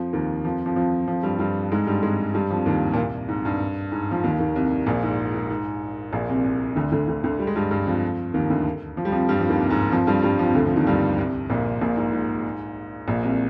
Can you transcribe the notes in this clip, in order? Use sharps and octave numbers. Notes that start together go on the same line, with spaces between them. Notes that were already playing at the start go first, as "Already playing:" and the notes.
Already playing: F2 F3
D#2 D#3
F2 F3
F2 F3
F2 F3
F2 F3
G2 G3
G2 G3
G#2 G#3
G2 G3
G#2 G#3
G2 G3
F2 F3
D#2 D#3
A#2
C2 C3
G#2
G2
G#2
F3
D#2 D#3
D#2 D#3
C2 C3
A#1 A#2
G#2
G#2
G#2
A#1 A#2
C2 C3
C2 C3
D2 D3
D2 D3
D2 D3
D2 D3
G3
G#3
G2 G3
G2 G3
F2 F3
D#2 D#3
D2 D3
F3
G3
F2 F3
G2 G3
F2 F3
D#2 D#3
C2 C3
G#2
F2 F3
G2 G3
G2 G3
F2 F3
C3
D2 D3
F2 F3
D#2 D#3
G2 G3
C2 C3
A#1 A#2
A#1 A#2
G#2
G#2
A#1 A#2
C2 C3